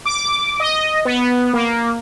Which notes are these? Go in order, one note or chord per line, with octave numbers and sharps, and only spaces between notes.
D6
D#5
B3
A#3